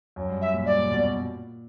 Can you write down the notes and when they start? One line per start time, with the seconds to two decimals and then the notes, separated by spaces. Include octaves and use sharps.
0.16 F#2
0.29 G2
0.41 E5
0.54 A#2
0.66 G2 D5
0.79 A#2
0.92 B2
1.03 A#2